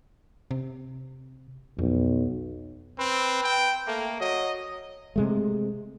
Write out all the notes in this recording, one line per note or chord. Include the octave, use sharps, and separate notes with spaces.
C3
B1 F2
C4 B4
G5
A3 A#3
F#3 D#5
C3 G#3 A3